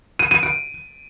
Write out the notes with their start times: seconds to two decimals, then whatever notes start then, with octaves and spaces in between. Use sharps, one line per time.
0.19 D#7
0.31 D#7
0.43 D7